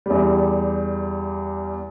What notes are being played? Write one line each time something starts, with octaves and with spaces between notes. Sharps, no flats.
E2 G3